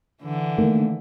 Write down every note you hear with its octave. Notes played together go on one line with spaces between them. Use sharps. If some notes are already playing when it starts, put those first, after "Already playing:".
D3 E3
D#3 A3 A#3